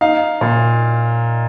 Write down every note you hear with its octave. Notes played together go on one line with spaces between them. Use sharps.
D#4 F5
A#2